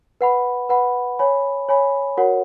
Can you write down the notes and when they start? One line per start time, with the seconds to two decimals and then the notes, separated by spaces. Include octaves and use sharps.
0.21 B4 F#5 B5
0.69 B4 F#5 B5
1.19 C#5 G#5 B5
1.69 C#5 G#5 B5
2.17 F#4 A#4 C#5 F#5